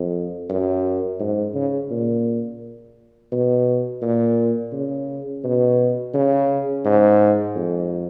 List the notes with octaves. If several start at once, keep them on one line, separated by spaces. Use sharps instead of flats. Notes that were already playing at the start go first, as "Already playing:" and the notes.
Already playing: F2
F#2
G#2
C#3
A#2
B2
A#2
C#3
B2
C#3
G#2
F2